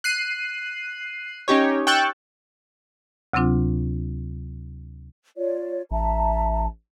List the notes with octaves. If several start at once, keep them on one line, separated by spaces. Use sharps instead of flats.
F#6 C7 D#7
C#4 D#4 G4 C#5
G5 C#6 E6 F#6 G6 A6
D2 C3 F#3 C4 D4 F4
F4 C#5 D5
A1 E5 A5 A#5